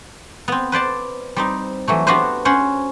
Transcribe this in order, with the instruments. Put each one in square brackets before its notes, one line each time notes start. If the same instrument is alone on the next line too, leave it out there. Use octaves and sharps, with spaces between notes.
[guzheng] B3 C4
B4 C5 D5 A5
G3 C4 D#4
E3 F#3 A3
B3 D4 F#4 G4 B4 C5
C#4 C5 F#5